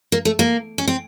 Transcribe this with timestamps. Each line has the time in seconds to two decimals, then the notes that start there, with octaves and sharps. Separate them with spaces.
0.12 A#3
0.25 A3
0.39 A#3
0.78 C#4
0.88 C4